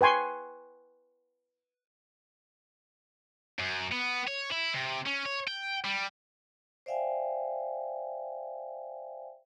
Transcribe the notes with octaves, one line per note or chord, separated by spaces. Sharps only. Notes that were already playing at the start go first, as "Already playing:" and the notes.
B4 G5 G#5 C6 C#6
F#2
B3
C#5
E4
C3
C#4
C#5
G5
G3
C5 D5 E5 F5 G5 G#5